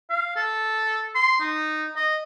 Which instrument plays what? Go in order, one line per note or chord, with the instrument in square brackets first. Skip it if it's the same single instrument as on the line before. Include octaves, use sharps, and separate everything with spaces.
[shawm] F5
A4
C6
D#4
D#5